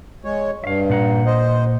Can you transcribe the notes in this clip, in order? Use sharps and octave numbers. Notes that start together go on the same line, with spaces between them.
G#3 C#5
G2 E5 F5
A#2 F#5 A#5
C5 D#5